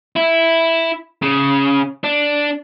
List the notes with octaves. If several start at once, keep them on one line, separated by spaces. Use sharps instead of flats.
E4
C#3
D4